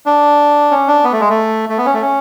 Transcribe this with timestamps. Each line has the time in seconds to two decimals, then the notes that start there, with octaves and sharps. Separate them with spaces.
0.06 D4
0.71 C#4
0.88 D4
1.04 B3
1.12 A3
1.20 G#3
1.29 A3
1.69 A3
1.78 B3
1.86 C#4
1.93 A3
2.02 C#4